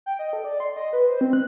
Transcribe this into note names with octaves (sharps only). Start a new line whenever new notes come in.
G5
D#5
A4
D5
C6
D#5
B4
C5
C4
F#6